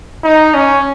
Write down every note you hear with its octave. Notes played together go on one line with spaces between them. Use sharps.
D#4
C#4